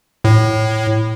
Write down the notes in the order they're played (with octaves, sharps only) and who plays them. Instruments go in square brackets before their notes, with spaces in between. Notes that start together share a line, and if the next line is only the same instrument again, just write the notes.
[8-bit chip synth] A2